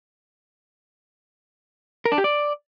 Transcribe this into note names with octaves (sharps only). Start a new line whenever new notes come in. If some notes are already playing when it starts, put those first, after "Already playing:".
A#4
D4
G4
D5